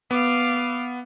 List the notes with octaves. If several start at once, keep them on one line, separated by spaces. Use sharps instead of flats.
B3 F5 D6